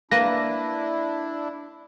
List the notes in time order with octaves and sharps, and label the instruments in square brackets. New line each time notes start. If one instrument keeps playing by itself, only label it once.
[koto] A#3 B4 A5 [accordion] D4 E4 [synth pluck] A#6